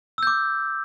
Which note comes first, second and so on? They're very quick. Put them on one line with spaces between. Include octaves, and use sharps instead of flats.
E6 G6 D6